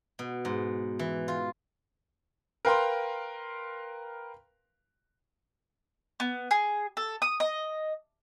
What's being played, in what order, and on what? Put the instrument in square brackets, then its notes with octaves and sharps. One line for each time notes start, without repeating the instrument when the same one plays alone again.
[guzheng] B2
G#2
E3
F4
[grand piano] A#4 B4 F5 G5 A#5 C6
[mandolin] B3
G#4
A4
D#6
D#5